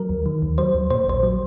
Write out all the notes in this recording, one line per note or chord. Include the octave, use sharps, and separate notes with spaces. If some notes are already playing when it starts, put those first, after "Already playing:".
Already playing: F#3 A#4
D#2
D#3
D#2
F#3 C5
D#2
A#2 C5
A#1 C5
F#3